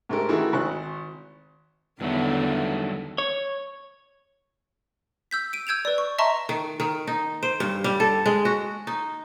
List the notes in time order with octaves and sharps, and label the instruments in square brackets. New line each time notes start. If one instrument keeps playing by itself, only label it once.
[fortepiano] G#2 A3 G4 A#4
D#3 E3 A3 E4 F#4 G#4
G#1 F#6
[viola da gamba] E2 D3 D#3 [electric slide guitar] G2 F#3 A3
[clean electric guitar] C#5
[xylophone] E6 G6 B6
D7 D#7
E6 G6 G#6 D7 E7 F7
B4 D5
C#6
D#5 E5 A5 A#5 C6 C#6
[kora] D#3
D#3
D#4
C5
G2
G3
A4
G#3
F#4
D#4